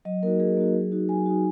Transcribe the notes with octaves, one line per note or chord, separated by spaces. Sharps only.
F#3 D#5
A#3 D#4 F#4 A#4
F#3 G#4
A#3 D#4 F#4
F#3
D#4 F#4
F#3 G#5
D#4 F#4